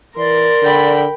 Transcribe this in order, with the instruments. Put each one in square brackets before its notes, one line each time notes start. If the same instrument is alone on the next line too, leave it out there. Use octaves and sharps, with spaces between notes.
[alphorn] E3 [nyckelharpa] A#4 [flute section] D5 C6
[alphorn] D3 [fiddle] G5 B5